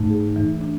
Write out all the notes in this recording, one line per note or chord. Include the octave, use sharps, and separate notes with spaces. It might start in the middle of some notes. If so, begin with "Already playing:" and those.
Already playing: G#2 A3
G#4
E3
D4